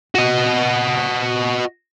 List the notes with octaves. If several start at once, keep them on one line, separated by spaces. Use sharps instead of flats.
F#4 D#5